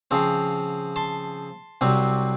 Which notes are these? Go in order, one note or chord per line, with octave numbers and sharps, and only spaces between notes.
C#3 F3 C4
A5 C6
C2 C3 F#3 C4